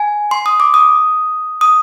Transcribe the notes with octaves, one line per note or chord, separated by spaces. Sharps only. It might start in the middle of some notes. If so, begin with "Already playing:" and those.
Already playing: G#5
C6
D#6
D6
D#6
D#6